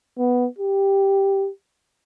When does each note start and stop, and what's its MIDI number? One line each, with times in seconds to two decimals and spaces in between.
0.18 0.47 59
0.59 1.49 67